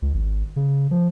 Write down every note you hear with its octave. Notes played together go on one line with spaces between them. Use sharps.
C#2
G#1
C#3
F3